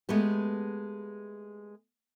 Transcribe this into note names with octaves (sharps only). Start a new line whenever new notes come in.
G#3 A3 B3 G4